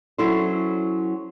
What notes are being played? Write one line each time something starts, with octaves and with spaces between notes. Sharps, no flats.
F#3 C#4 E4 A4 C5